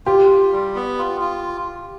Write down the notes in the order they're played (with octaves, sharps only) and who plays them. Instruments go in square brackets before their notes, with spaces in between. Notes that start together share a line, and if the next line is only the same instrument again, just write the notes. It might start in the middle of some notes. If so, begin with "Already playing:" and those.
[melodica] F4 [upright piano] G4
[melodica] F4
G3
B3
F4
F4